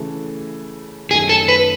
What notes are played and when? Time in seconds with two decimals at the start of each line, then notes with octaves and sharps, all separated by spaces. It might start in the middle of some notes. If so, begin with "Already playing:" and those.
Already playing: C#3 E3 A3
1.11 F#2 D#3 F#3 A3 G#4
1.29 A4
1.48 B4